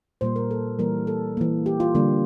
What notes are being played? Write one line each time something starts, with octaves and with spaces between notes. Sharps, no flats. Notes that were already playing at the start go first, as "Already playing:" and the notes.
A#2 G3 A#3 C5
A#4
A4
E3 G3 A#3 A#4
A4
E3 A#3
G4
F4
D3 G3 A#3